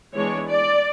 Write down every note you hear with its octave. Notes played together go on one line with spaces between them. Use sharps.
E3 G#3 B3 D4 C#5
D5